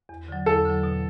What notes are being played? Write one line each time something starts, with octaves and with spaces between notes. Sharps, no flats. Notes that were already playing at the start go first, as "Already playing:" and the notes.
E2
D3 F#3
E2 A4
D3 F#3
B2